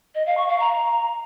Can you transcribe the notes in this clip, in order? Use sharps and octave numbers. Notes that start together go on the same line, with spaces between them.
D#5
F5
C#6
F5
A#5